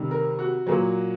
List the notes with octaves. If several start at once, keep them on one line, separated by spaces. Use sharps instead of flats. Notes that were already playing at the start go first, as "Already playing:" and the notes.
Already playing: C3 D#3 G3
A#4
F#4
A#2 F#3